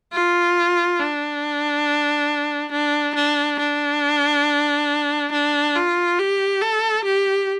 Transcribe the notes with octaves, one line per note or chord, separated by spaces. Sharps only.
F4
D4
D4
D4
D4
D4
F4
G4
A4
G4